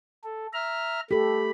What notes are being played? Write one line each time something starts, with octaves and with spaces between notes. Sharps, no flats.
A4
E5 A#5 F6
A3 G4 A4 B5